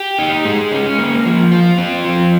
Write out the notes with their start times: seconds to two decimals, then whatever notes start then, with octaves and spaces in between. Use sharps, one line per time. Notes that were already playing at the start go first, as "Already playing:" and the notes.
Already playing: G4
0.19 D#4
0.45 G#3
0.72 C#4
0.98 A#3
1.26 F3
1.52 F4
1.78 C4
2.05 F3